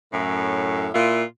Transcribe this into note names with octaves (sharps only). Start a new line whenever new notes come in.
F#2 A2
A#2 E4 F4